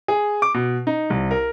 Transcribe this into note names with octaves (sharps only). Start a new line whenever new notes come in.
G#4
D6
B2
D#4
C2
A#4